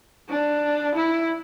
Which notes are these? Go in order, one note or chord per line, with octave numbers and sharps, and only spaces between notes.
D4
E4